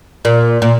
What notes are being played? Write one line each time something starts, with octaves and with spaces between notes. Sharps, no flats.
A#2
A#2